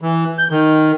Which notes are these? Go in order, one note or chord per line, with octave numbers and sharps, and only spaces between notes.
E3
G6
D#3